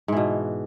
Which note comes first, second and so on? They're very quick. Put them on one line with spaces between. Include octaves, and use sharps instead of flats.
G#2 E3 B2